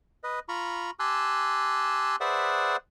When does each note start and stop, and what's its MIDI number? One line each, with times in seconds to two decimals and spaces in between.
0.24 0.39 71
0.24 0.39 75
0.49 0.91 65
0.49 0.91 82
0.49 0.91 83
0.49 0.91 85
1.00 2.16 67
1.00 2.16 80
1.00 2.16 81
1.00 2.16 84
1.00 2.16 88
1.00 2.16 90
2.20 2.77 68
2.20 2.77 71
2.20 2.77 72
2.20 2.77 74
2.20 2.77 76
2.20 2.77 78